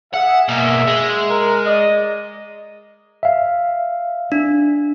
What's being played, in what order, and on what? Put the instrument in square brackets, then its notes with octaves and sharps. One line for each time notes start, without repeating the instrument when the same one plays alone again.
[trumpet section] G#4 E5 [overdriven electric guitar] F#5
[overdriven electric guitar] B2 A#3
G#3
[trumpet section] A#4
D5 D#5
[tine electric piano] E5 F5
[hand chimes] D4